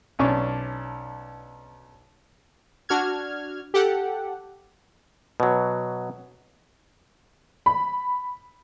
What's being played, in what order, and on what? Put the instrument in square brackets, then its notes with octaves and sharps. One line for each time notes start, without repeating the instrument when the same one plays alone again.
[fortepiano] B1 C#4 D4 C#6
[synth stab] D4 F#4 F6 G#6
G4 A4 F#5
[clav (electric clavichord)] B2 F#3
[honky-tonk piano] B5